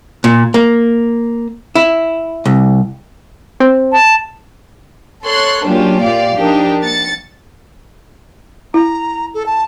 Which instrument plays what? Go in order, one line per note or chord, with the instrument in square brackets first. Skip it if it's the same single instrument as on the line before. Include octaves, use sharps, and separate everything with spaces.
[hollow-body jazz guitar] A#2
A#3
E4
C2
[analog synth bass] C4
[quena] A5
[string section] A4 C#5 C6 F#6
F#3 A#3 C#4 D4 F4 G4
A#2 F4 G4 D5 F5
F3 D4 D#4 G4 A#4
A#3 A6 C#7
[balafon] E4 [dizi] A#5
[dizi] A4
A5